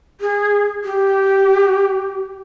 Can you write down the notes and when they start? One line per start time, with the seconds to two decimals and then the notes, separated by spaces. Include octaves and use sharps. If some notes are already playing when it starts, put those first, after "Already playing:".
0.21 G#4
0.84 G4